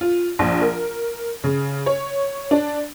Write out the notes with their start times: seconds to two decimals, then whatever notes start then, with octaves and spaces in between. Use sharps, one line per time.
0.01 F4
0.39 A#1
0.61 A#4
1.44 C#3
1.86 C#5
2.51 D4